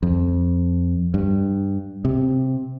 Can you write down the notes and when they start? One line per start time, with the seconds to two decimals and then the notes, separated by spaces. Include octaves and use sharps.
0.03 F2
1.14 G2
2.05 C3